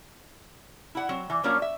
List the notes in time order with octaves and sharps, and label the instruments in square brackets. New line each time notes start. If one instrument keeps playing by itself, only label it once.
[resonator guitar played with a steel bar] E4 F#5
F#3 C4
E3
F3 F#3 A#3 C#4 D4 F4
E5